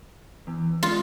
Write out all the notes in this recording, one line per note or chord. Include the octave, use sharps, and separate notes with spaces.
E2
G#3 F4